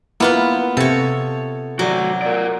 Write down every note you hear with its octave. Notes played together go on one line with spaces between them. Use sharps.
A#3 B3 E4 F4 B4
C3 A4 C#5
F#3 F#4 D5
A#4 D5